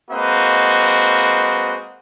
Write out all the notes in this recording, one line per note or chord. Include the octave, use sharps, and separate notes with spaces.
G#3 A#3 C4 F#4 B4 D#5